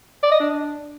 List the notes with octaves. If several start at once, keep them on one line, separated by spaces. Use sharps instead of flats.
D5
D#5
D4